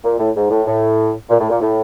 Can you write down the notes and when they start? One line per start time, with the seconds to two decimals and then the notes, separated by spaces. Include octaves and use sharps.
0.04 A#2
0.19 A2
0.35 G#2
0.50 A2
0.67 A2
1.30 A#2
1.40 A2
1.50 A#2
1.61 A2